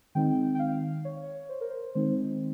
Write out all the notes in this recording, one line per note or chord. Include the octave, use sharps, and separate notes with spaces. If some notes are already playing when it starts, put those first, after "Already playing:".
D#3 G#3 C4 D#4 G5
G5
F5
C#5
C5
A#4
C5
D#3 G#3 C4 D#4 C5